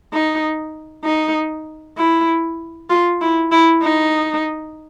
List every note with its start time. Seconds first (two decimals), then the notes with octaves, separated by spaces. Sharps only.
0.13 D#4
1.05 D#4
1.97 E4
2.90 F4
3.21 E4
3.52 E4
3.82 D#4